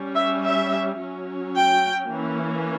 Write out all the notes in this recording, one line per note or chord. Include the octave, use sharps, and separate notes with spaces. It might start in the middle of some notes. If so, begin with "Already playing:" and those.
Already playing: G3 C#4
E5
E5
F#3 C#4
G5
E3 A#3 C#4